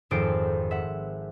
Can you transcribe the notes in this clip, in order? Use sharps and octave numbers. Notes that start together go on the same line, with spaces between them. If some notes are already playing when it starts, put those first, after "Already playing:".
G#1 F2 A4 C5 D7
E5 F#5